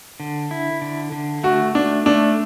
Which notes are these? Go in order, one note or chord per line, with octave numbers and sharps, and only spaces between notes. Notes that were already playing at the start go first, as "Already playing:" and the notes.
D3
E4
D3
D3
A3 F#4
A3 D4
A3 D4